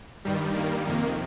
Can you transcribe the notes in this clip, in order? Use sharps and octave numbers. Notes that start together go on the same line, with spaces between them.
G2 D#3 G3
A#3
F2 C3 D#3 A#3